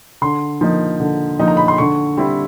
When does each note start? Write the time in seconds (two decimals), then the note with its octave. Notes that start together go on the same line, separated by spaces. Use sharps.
0.22 D3 C6
0.61 F3 A#3 D#4
1.00 D3
1.39 F3 A#3 D#4
1.48 A#5
1.57 B5
1.68 C6
1.78 D3 C#6
2.17 G3 C4 E4